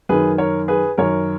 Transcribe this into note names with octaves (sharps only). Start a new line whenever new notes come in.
F#2 D#3 G#4 B4
A#4 C#5
G#4 B4
F#2 D#3 A#4 C#5